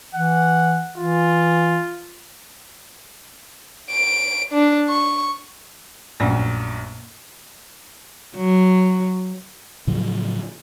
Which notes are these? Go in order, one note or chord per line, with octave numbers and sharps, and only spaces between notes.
E3 F#5
E3 F4
D7
D4
C#6
A#1 F#2 A#2 A3 A#3
F#3
A2 C#3 F3 F#3